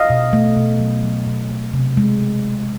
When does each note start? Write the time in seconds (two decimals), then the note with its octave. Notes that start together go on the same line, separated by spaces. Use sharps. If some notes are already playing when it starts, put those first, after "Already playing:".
Already playing: D#5 F5
0.10 B2
0.33 A3
0.57 B2
0.80 F#3
1.03 F#3
1.26 B2
1.50 A3
1.73 C3
1.97 G#3